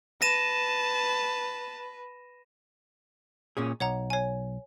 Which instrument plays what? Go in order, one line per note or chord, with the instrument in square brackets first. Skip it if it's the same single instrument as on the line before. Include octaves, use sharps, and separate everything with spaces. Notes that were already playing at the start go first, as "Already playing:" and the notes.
[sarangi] B4 [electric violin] A5 [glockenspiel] A#6 D#7 E7
[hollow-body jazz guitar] A#2 C#4 G#4
[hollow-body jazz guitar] B1 [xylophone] C#5 F#5 A#5
[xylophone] C#5 G#5